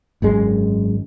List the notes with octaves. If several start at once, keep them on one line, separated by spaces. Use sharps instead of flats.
G#1 F#2 G#3